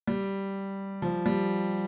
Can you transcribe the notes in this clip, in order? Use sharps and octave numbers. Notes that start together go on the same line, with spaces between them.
G3
F3
G3